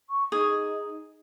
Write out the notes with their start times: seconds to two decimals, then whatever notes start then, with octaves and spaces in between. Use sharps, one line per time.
0.09 C#6
0.32 D#4 G#4